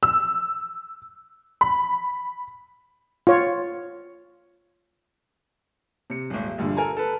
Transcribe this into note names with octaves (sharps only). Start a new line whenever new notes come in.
E6
B5
F4 C#5
C3 C#7
D#1 G#1
A#1 G2 D3
A4 A#4 G#5 A#5
A4 B4